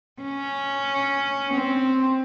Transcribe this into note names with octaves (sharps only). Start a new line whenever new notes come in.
C#4
C4